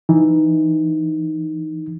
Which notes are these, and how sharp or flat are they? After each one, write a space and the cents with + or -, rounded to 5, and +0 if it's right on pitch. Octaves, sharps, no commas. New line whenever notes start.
E3 +0 D#4 +0